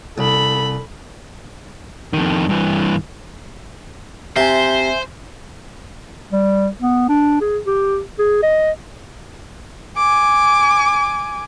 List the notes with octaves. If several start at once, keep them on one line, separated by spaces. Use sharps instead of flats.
C2 A4 B5
F2 D#3
G2 E3
C3 C5 E5 G#5
G3
B3
D4
G#4
G4
G#4
D#5
G#5 D6